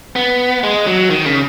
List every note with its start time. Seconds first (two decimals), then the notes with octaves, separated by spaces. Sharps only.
0.16 B3
0.64 G#3
0.87 F#3
1.10 D#3
1.26 C#3